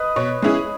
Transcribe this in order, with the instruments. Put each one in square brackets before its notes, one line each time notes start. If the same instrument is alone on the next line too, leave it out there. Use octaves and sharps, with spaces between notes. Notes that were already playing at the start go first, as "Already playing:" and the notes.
Already playing: [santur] B4 D#5
[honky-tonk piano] B2 [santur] C#5
[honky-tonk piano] G#3 C#4 E4 G#4